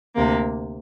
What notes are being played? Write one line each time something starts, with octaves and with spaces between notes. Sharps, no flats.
D2 C3 A#3